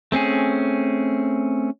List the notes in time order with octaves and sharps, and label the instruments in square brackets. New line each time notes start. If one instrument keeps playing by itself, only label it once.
[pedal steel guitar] A3 C4 C#4 G#4